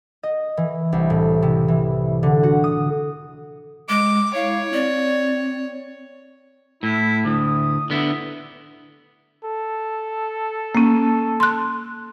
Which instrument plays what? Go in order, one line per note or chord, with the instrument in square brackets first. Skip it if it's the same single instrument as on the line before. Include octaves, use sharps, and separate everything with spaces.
[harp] D#5
E3
C2
A2
C3
E3
D3
F#4
D#6
[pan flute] G#3 [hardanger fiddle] D6
[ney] E4 [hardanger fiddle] C#5 [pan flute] F5
[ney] C4 [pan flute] D5
[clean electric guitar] A2 [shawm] E4
[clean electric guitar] D2 A2 [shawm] D#6
[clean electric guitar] D3 B3 E4
[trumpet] A4
[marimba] A#3 C#4
C6 F#6